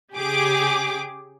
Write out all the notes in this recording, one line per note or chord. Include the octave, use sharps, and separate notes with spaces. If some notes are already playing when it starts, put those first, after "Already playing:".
C#3 G4 G#4 D6